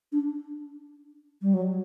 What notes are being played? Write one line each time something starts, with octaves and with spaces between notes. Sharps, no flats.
D4
G3
F#3